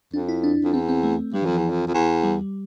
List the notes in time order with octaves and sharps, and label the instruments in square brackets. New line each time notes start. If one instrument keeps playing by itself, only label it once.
[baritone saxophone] F2 [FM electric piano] D4
[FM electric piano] E4
D4
[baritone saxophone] F2
[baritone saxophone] E2 [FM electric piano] C4
[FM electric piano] C4
A3
[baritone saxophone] G2 [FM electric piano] G3
[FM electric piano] E3
[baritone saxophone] F2 [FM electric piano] F3
[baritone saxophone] E2
F2
F2
E2
[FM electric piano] G3